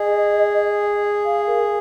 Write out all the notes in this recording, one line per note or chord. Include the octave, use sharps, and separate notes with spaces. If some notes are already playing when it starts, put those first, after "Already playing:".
Already playing: G#4 D#5
F5
A#4